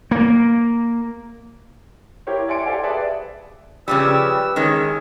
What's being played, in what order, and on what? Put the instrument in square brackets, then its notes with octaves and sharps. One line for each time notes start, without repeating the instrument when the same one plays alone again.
[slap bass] A#3
[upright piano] E4 G4 A#4 C5 C#5
D5 E5 G#5 C6 C#7 D7
G4 A4 C5 E5 F5 G#5
G#4 B4 D5 E5 A5
[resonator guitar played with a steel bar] C#3 F3 G3 [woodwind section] G4 B4 E6
[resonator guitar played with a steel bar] D#3 G#3 C#4